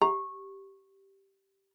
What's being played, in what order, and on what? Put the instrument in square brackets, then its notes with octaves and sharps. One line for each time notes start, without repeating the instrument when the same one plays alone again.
[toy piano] G4 [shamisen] A#5